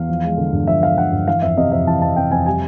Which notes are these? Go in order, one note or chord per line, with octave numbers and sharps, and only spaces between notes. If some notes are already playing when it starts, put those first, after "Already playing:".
Already playing: E2 F5
F3
G#3
D3
G2
F3 E5
G#3 F5
D3 F#5
G2
E3 F5
F2 E5
C3 D#5
F2 E5
E3 A5
F2 A5
C3 G5
F2 G#5
G3 G#5